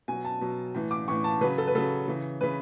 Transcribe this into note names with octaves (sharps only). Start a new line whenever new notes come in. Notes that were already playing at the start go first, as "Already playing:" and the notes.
B2 G#5
F#3
A5
B2 F#3
A2 E3
D6
A2 E3 C#6
A5
C#3 F#3 B4
A4
B4
C#3 F#3 A4
C#3 E3
C#3 E3 B4